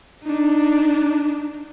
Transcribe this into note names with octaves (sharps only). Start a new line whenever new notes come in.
D4 D#4